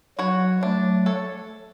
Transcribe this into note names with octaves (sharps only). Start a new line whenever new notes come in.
F#3 F#4 C#5
F#3 A3 D4
A4 C#5